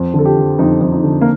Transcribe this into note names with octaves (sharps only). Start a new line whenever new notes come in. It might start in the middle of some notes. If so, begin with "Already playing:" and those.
Already playing: F2
D3 A4
G4
F3
F2 D#4
F2
D#4
D3
A#3